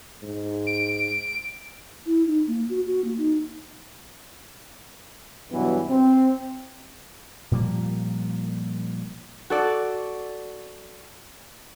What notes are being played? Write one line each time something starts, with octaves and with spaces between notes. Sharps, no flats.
G#2
D7
E4
D#4
A#3
F#4
F#4
A#3
D#4
G2 B2 E3 F#3 B3
C4
A#2 F3 G3 A#3
F#4 A4 D5